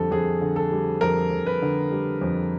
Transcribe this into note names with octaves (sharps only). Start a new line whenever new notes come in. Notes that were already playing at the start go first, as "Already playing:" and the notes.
Already playing: F2 D3 G3 A4
F2 G#4
D3
A4
G3
F2 A#4
F2
B4
D3
G3
F2